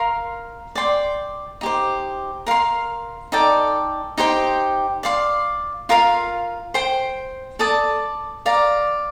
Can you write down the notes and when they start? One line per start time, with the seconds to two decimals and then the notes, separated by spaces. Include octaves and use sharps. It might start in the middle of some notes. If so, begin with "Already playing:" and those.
Already playing: A#4 F5 C6
0.75 D5 G5 C6
1.61 D#4 G4 C5
2.47 A#4 F5 C6
3.32 D#4 A4 D5 G5
4.18 D#4 G4 C5 G5
5.03 D5 F5 C6
5.89 F4 A#4 F5 C6
6.74 C5 G5 C6
7.59 A4 D5 A5 D#6
8.46 D5 F5 A#5